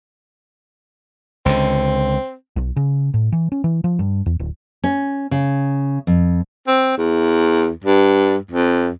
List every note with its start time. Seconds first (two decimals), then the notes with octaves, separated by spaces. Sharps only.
1.46 C#2 D3 C4
2.56 B1
2.76 C#3
3.14 A2
3.32 E3
3.52 C#4
3.64 E3
3.84 F3
3.99 G2
4.26 E2
4.39 D1
4.84 C#4
5.31 C#3
6.07 F2
6.68 C4
6.98 E2
7.84 G2
8.51 F2